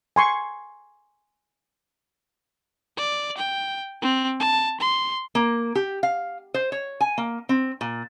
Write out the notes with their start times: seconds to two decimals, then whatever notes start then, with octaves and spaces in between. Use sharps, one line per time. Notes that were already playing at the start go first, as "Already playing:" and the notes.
0.16 G#5 C6 C#6
2.97 D5
3.37 G5
4.02 C4
4.40 A5
4.80 C6
5.35 A#3
5.75 G4
6.03 F5
6.54 C5
6.72 C#5
7.01 G#5
7.18 A#3
7.49 C4
7.81 A#2